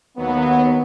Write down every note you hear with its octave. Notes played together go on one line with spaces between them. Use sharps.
D#2 F#3 B3